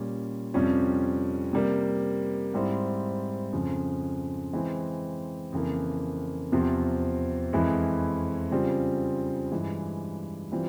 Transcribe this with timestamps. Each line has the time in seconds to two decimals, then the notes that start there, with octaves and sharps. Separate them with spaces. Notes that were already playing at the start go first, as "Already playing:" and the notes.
Already playing: A#2 G3 C#4
0.54 F2 C3 G3 C#4 F4
1.53 C3 G3 A#3
2.54 G#2 G3 C4 E4
3.53 F2 C#3 F3
4.53 E3 G#3 C4
5.52 F2 C#3 E3 A#3
6.52 E2 C3 F3 C4
7.53 F2 E3 G#3 E4
8.51 C#3 G3 C4 F4
9.52 G2 E3 G#3
10.52 E3 G3 C4 F4